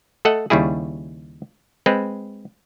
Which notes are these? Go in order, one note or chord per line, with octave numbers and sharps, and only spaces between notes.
A3 A4 D#5 F#5
D#2 C#3 G3 E4 G#4
G#3 C4 B4